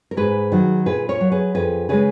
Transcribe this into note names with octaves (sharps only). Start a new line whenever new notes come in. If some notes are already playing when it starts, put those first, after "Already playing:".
A#4
G#2 G#4 B4
D#3 F#3
A#2 G#4 B4
A#4 C#5
F#3
G#4 B4
F2 G#4 B4
C#3 G#3 G#4 B4